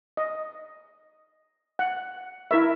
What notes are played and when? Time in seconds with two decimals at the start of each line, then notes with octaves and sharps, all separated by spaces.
0.17 D#5
1.79 F#5
2.51 E4 A#4 E5